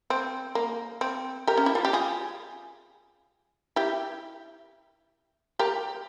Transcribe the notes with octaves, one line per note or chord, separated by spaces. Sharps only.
C4
A#3
C4
G4 A#4
C#4
E4
F4
G4
F4 G#4
E4 G4
G4 A#4